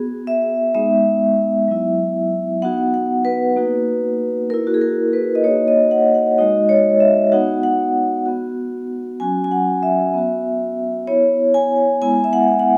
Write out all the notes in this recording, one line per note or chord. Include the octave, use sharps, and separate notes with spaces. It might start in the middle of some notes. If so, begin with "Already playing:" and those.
Already playing: B3 F#4 G#4
E5
G#3 B3 D#4 E5
F#3 B3 E4
B3 D#4 F#4 F#5
F#5
B4
A#3 D#4 F#4
A#3 E4 A#4
F#4
G#4
A#4
B4
D#5
A#3 D#4 F#4 C#5
D#5
F#5
F#5
G#3 D#4 F#4 D#5
C#5
E5
B3 D#4 F#4 F#5
F#5
B3 F#4
F#3 C#4 F#4 G#5
G#5
F#5
E5
B3 F#4
B3 E4 C#5
G#5
G#3 B3 E4 G#5
E5
F#5
F#5